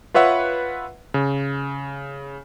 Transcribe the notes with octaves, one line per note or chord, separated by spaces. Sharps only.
F4 B4 C#5 E5 F#5
C#3